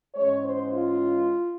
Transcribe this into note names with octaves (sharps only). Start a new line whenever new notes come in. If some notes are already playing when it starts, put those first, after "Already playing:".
G#2 E3 G#3 C#4 C#5
C5
F4